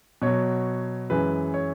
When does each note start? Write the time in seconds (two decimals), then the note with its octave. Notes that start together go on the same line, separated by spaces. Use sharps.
0.22 B2 F#3 C#5
1.10 F#2 E3 G#3 B4
1.54 C#5